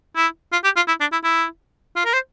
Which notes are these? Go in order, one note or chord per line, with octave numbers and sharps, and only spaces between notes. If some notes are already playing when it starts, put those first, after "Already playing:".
E4
F4
G4
F4
E4
D4
E4
E4
F4
A#4
C5